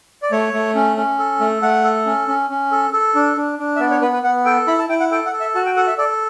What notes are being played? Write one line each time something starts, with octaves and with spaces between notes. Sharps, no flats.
D5
A3 C#5
A3
C#4
C#4
A4
A3
A3 F#5
A4
C#4
C#4
C#4
A4
A4
D4
D4
D4
E5
B3 D5
C#5
B3 B4
B4
B3 F#5
A4 G5
E4 B5
A5
E4 G5
F#5
A4 G5
F#5
A4
E5
F#4 A5
G5
A4 F#5
E5
A4 D5